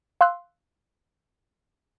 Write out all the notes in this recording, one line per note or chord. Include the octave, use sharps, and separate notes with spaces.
F5 C6 E6 F#6